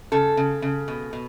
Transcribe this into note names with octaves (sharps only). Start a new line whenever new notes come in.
C#3 A4
C#3
C#3
B2
B2